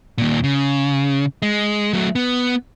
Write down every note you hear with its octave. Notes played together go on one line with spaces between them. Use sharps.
D#2 A#2
C#3
G#3
F#3 A3
B3